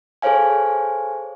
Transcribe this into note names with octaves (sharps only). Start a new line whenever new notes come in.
G#4 A4 C5 C#5 F5 G#5